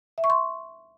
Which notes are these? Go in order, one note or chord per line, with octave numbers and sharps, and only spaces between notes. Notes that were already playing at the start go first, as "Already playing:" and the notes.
E5
C#6
C6